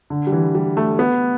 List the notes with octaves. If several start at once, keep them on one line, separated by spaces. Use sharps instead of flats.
D3
G3
E3
G3
A3
B3